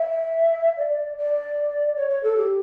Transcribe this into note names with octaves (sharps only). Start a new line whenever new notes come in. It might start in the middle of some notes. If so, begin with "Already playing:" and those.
Already playing: E5
D5
D5
C#5
C#5
A4
G4